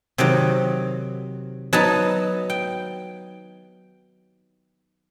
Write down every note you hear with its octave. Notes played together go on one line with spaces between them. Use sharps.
C3 D#3 F#3 G5
F#3 B3 D#4 A5
G5